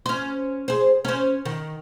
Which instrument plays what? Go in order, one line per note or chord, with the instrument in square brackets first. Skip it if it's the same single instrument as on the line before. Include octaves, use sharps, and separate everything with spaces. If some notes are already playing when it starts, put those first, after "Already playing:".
[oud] C#4 C5
G#4 C5
C#4 C5
D#3